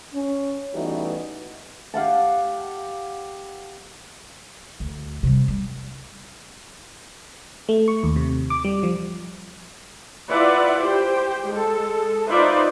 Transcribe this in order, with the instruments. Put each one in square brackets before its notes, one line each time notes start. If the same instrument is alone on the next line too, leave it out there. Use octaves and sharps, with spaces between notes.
[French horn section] C#4
E3 G3 A3 B3 D#4 F#4
[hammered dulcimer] G4 F5 F#5 A5
[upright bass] D2
C3 G3
G3
[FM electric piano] A3
C#6
D#2
C3
D6
G3
F3
[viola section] E4 F4 B4 D5 E5 F#5
G4 C5 G5
G#3 A4
D#4 F4 B4 C5 D5 E5